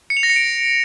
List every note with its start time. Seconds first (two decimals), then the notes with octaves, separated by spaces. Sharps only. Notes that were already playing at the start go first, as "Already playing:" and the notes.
0.10 C#7
0.17 F7
0.23 A#6
0.30 C#7
0.36 D7